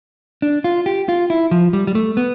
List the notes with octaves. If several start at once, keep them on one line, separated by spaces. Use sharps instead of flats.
D4
F4
G4
F4
E4
F3
G3
G3
A3
B3